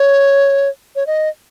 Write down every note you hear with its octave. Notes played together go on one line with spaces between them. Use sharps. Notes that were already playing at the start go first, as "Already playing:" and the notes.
Already playing: C#5
C#5
D#5